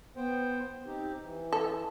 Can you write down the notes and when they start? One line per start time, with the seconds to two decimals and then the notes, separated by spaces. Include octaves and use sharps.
0.17 B3 C5 G5
0.86 C4 D#4 G4
1.23 E3
1.53 A4